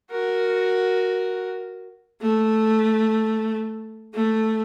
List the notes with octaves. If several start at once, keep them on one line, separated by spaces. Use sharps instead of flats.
F#4 A#4
A3
A3